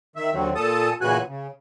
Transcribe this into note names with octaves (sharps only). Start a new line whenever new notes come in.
D#3 E5
D#2 D3 F#3 C4
A#2 A4 A5 D#6
A#2 C#3 E3 F#4 G#5 F#6
C#3